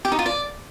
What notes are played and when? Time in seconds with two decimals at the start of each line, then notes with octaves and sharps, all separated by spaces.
0.05 G4
0.12 D#4
0.19 F4
0.26 D5